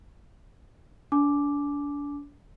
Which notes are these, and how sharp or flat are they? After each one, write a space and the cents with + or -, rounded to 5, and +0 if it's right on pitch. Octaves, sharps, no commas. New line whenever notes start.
D4 -35 G#5 +35 D6 +0